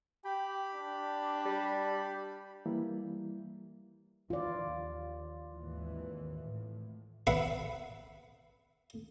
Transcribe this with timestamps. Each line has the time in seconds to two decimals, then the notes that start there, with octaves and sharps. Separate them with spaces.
0.25 G4 G5 B5
0.73 D4
1.46 G3
2.66 E3 G3 A#3 E4
4.30 E3 F4 D5
4.65 D#2
5.54 G#1 D#2 E3
6.43 A2
7.27 B4 E5 F#5 B5